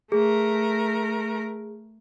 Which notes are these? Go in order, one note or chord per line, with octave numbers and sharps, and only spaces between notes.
A3 G#4 A#4